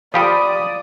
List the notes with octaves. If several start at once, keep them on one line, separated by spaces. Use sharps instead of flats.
F3 F4 G4 A4 D5 F5 B5 D#6